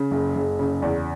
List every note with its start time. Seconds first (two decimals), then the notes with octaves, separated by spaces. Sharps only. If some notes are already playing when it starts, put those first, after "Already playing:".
Already playing: C#3
0.11 F#1
0.35 F#1
0.59 C#3
0.82 E2